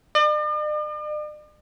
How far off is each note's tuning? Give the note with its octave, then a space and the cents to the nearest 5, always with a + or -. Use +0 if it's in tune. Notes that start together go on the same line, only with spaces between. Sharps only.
D5 +45